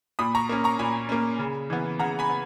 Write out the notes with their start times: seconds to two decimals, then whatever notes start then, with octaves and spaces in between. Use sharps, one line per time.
0.19 A#2 B5 D#6
0.35 A#5 C#6
0.49 A#3 C#4
0.64 A#5 C#6
0.79 A#2 G#5 B5
1.09 A#3 C#4
1.39 C#3
1.70 E3 B3
1.99 C#3 F#5 A#5
2.19 G#5 B5
2.30 B3